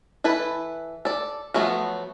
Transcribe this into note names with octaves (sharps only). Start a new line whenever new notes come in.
E3 E4 A4 B4
A4 D5
F3 F#3 A3 B3 F#4